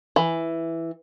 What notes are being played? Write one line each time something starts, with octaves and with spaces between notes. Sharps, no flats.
E3